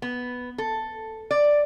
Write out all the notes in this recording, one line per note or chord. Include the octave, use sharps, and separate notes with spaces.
B3
A4
D5